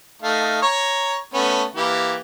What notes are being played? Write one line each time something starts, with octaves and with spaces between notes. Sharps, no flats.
A3 D#4 F5
C#5 A#5 C#6
A3 B3 C#4
E3 A#3 G4